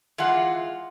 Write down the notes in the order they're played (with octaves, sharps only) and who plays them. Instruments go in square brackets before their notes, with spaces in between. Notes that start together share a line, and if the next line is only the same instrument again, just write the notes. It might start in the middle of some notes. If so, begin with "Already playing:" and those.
[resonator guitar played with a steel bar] E3 G#3 F4 F#5